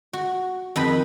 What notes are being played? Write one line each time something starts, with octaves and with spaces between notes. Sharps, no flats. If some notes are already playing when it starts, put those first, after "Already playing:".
F#4
F2 D#3 B4 B5